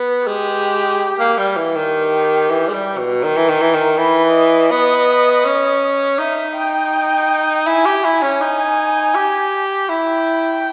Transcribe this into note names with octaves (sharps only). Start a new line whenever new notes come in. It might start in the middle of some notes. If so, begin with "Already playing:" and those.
Already playing: B3
G#3 G4
A#3
G3
E3
D#3 G4
E3
G#3
G3
B2
D#3 A#4
E3
D#3
E3
D#3
E3 B4
D#5
B3
C#4
D#4 E5
G5
E4 G#5
G4
E4 G#5
C#4
D#4
G4
E4 G5